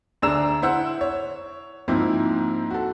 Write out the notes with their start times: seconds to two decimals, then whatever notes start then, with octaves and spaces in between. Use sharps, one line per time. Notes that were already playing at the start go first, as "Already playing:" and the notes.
0.22 D2 D4 G#4 A#5 E6 E7
0.62 E4 C5 F#5 E6
1.01 C#5
1.88 G#2 F3 A#3 C4 E4
2.70 F#4 A4